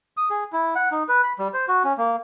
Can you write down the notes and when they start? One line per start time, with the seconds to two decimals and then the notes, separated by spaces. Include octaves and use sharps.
0.17 D#6
0.30 G#4
0.53 E4
0.76 F#5
0.92 D#4
1.09 B4
1.23 B5
1.39 G3
1.54 C5
1.68 F#4
1.84 C#4
1.98 A#3